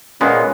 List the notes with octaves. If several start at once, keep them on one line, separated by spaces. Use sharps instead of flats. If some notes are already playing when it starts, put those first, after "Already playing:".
A#2 G#3 B3 C#4